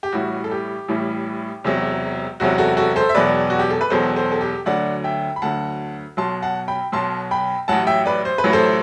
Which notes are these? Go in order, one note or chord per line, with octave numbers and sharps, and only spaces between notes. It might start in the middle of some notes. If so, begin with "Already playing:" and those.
G4
A1 A2 E3 G3 F#4
A4
G4
A1 A2 E3 G3
E1 E2 C3 F#3
E1 E2 C3 F#3 F#4
F#4 A4
F#4 A4
A4 C5
E5
E1 E2 B2 F#3 B4 D5
F#4
G4
A4
B4
E1 E2 B2 F#3 A4 C5
A4 C5
A4
G4
D2 D3 F#3 D5 F#5
E5 G5
B5
D2 D3 F#3 F#5 A5
B1 B2 F#3 A5 C6
F#5 A5
G5 B5
B1 B2 F#3 A5 C6
G5 B5
A1 A2 F#3 F#5 A5
E5 G5
B4 D5
C5
B4
A1 A2 F#3
A4 C5